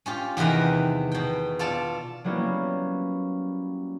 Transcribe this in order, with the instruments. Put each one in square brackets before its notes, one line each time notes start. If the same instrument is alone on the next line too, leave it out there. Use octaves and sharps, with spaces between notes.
[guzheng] C#4 F4 G4
E2 C3 D#3 B4 A#5
B2 G5
F4 A4 D5 A5
[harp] F#3 G3 A#3 B3 C#4 E4